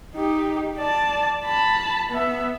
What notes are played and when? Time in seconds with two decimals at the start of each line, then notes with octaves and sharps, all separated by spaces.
0.14 D#4 G4
0.76 D5 A5
1.44 A5 B5
2.10 B3 E5